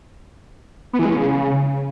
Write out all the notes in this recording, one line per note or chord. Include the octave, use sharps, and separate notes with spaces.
B3
E3
G#3
C#4
C#3